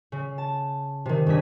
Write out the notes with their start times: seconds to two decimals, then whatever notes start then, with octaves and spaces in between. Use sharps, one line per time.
0.12 C#3
0.38 A5
1.05 C3 D#3
1.26 G2 C#3 D4 G#4 B6